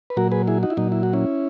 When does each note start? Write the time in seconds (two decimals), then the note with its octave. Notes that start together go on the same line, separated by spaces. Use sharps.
0.10 B4
0.17 A#2 F#3 F#4 A#4
0.32 G#4 B4
0.47 E4 G#4
0.63 D#4 F#4
0.70 E4
0.77 A#2 F#3 D#4
0.92 E4
1.03 F#4
1.13 C#4 E4